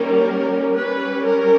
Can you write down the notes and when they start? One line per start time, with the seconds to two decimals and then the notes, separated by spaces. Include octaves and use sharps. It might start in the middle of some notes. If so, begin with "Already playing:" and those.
Already playing: D#3 G3 A#3 C#4 A#4
0.75 G3 C#4 B4
1.25 A#4